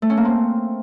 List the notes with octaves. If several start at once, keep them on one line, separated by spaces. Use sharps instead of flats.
A3
C#4
A#3
C4